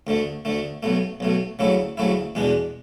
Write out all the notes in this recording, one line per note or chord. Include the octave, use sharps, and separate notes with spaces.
D2 D3 A3
D2 D3 A3
B1 B2 A3
B1 B2 A3
D2 C#3 F#3 A3 E4
D2 C#3 F#3 A3 E4
E2 B2 G#3 D4